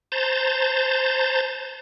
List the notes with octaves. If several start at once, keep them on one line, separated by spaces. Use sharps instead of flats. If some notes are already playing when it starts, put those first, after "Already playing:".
C5 A5 A#5 G6 A6